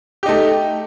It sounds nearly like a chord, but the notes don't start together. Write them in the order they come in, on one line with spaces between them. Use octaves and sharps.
G4 D#4 A3